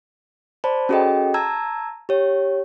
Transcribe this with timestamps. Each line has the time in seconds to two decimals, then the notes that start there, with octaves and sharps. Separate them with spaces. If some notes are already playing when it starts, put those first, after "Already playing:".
0.64 C5 D5 A5 B5
0.89 C#4 F#4 G#4 A4 D#5 G5
1.34 A5 A#5 E6 G#6
2.09 G4 C#5